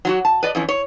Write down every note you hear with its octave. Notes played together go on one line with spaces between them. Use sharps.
F#3 F4 F#4
A5
B4 D5 D#5
F2 E3 C#4
C#5